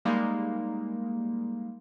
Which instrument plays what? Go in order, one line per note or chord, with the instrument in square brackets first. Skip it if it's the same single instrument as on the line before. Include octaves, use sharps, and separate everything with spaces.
[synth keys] G3 G#3 A#3 D#4